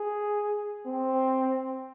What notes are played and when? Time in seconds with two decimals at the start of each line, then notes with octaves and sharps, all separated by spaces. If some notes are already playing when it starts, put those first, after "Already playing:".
Already playing: G#4
0.86 C4